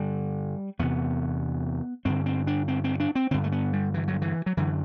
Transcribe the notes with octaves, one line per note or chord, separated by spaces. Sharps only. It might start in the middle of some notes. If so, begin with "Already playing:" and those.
Already playing: G2 D3 G3
E2 C3 B3
G2 D3 C4
C4
D4
C4
C4
D4
C4
G2 D3 C4
A3
B3
G3
E3
F#3
E3
F#3
F#2 D3 E3